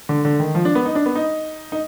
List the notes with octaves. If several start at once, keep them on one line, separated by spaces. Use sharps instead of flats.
D3
D3
D#3
F3
D4
B3
D#4
D4
B3
D#4
D#4